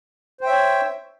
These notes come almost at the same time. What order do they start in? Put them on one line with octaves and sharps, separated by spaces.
C5 G5 E5 C#5